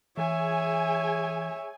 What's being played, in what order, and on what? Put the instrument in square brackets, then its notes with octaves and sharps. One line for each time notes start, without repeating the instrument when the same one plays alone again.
[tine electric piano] E3 [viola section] G#4 G#5 [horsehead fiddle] C#5 E5